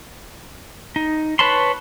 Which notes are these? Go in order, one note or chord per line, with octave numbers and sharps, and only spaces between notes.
D#4
B4 C#5 A5 B5 C6